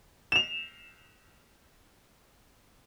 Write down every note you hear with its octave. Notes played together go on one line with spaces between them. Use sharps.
E7 F7